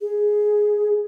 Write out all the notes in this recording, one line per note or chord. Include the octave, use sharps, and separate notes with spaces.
G#4